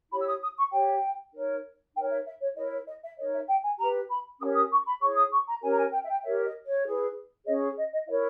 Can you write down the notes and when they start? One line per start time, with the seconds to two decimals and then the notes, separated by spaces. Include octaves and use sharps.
0.10 E4 G4 C#5 B5
0.20 E6
0.26 D#6
0.41 D#6
0.56 C#6
0.71 G4 C#5 G5
1.34 D#4 A#4 C#5
1.94 D#4 A#4 C#5 G5
2.10 E5
2.25 E5
2.40 C#5
2.55 E4 A#4 C#5 D#5
2.71 C#5
2.86 D#5
3.02 E5
3.17 D#4 A#4 C#5 D#5
3.32 E5
3.47 G5
3.63 G#5
3.78 G4 B4 A#5
4.08 B5
4.39 C#4 G4 A#4 C#5 D#6
4.55 D#6
4.70 C#6
4.85 B5
5.01 E4 G#4 C#5 C#6
5.16 D#6
5.31 C#6
5.47 A#5
5.62 C#4 G4 A#4 C#5 G#5
5.72 A#5
5.77 G#5
5.92 G5
6.03 E5
6.08 G5
6.23 G4 A#4 C#5 E5
6.44 D#5
6.64 C#5
6.85 E4 G#4 B4
7.46 C#4 G#4 C#5 D#5
7.77 D#5
7.92 D#5
8.07 E4 A#4 C#5 E5